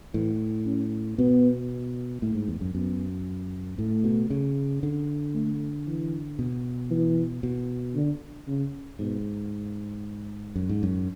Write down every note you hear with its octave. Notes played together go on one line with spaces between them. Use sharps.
A2 E3
C#4
B2 B3
A2 A3
G#2
E2
F#2
F#2 B3
A2 A3
B2
C#3
D3
A3
E3
B2
E3
B2
D3
C#3
G#2 B2
F#2
G#2
F#2